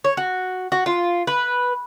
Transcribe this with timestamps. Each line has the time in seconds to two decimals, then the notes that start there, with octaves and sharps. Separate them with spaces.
0.04 C#5
0.17 F#4
0.72 F#4
0.86 F4
1.27 B4